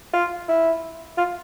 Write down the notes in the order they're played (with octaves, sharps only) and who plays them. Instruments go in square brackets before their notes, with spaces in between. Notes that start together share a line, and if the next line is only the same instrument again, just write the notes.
[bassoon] F4
E4
F4